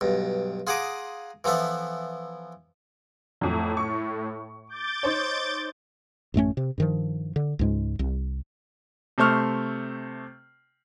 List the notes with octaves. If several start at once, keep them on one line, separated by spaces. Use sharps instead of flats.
B1 G2
F4 G#4 F#5 A#5 D6 D#6
E3 F3 B3 A4 E5
F2 A2 F#3
C#6
D6 G6 A6
D#4 C5 C#5
A1 F#2 A3 C#4
C3
G2 D#3 F3
D3
C#2 G#2 G#3
C2
C3 A3 C5 C#6 F6